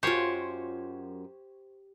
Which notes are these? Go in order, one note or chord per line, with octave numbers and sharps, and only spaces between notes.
F#2 F4 G4 C5 C#5